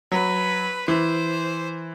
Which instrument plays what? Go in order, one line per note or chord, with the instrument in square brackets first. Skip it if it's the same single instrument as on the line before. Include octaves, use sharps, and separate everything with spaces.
[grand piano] F#3 [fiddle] B4
[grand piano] E3 [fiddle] C5